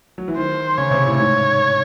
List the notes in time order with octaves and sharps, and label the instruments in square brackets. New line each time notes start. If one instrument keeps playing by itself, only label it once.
[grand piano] F#3
E3
[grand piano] D#3 [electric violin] C5
[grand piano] C#3 [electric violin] C#5
[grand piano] C3
A2
[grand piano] G#2 [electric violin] C#5